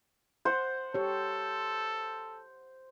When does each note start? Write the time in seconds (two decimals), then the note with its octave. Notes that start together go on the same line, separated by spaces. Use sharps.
0.45 C5 F#5
0.94 G4 A4 C#5